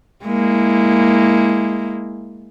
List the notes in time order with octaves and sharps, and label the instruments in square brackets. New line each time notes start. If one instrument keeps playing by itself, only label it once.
[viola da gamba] G#3 A#3 E4